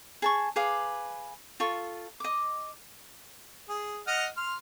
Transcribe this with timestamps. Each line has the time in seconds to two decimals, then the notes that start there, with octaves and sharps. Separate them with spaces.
0.22 G#4 A5 C#6
0.56 G#4 B4 F5 D6
1.60 F4 A4 C#6
2.20 D#5 D6
3.69 G#4
4.07 D#5 F#5 F6
4.37 C6 F6